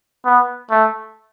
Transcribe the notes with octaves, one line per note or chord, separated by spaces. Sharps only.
B3
A3